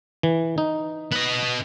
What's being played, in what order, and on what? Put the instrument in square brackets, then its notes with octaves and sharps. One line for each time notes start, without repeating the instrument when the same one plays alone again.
[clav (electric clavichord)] E3
D#4
[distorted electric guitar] B3 D#5